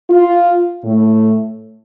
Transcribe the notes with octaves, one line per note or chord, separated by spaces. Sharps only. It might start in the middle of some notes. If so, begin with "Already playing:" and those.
F4
A2 A3